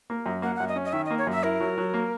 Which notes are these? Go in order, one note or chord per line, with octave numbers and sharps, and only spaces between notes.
A#3
F#2
A#3 F#5
F#5
F#2
D#5
C#4
D#5
D#3 E5
D#5
A#3
C#5
F#2 E5
E4 A#4
F#3
F#3
A#3